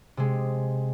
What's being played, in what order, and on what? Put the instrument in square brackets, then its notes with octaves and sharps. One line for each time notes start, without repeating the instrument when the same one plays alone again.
[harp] C3 G#3